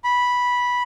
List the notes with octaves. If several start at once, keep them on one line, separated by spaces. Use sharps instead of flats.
B5